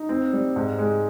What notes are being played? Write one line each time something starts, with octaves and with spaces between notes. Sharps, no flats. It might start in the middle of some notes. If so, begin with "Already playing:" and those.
Already playing: D#4
C4
G3
G#2
G#3